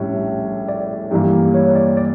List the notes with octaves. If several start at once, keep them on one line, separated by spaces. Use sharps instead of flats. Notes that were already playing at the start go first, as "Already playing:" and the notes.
Already playing: A#1 A2 G3 C#4 E5
D5
G2 E3 A#3
C#5
D5
D5